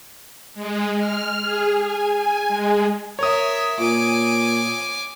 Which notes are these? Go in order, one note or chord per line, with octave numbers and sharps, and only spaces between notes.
G#3
F6
G#4
G#5
G#5
G#3
A#4 C#5 E5 D#6
A#2 G#5 D6